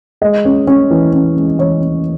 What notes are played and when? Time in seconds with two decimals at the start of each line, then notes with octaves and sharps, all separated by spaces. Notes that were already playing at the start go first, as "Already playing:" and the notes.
0.21 G#3 D#5
0.45 C#4
0.67 C#4
0.91 E3
1.13 C#4
1.36 G#3
1.58 E3 C#5
1.81 C#4